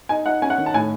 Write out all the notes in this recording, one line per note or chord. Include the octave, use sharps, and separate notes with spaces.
D#4 G#5
D#4 F#5
C#4 G#5
F#5
D#3
A5
A2 G#5